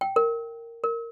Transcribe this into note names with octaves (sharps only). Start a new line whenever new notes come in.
G5
A#4
A#4